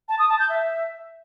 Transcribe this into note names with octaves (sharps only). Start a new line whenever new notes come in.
A5
D#6
A5
G6
E5